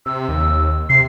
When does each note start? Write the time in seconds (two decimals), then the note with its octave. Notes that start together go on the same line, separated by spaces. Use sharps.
0.06 C3 E6
0.28 D#2
0.89 C3 C7